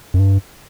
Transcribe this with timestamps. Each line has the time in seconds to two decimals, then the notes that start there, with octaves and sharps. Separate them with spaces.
0.14 F#2
0.19 G2